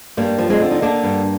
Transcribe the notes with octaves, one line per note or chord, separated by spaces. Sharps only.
G2 G3 A#3
F3
G#3 C4
D3
D#4
D3 A#3 D4
G2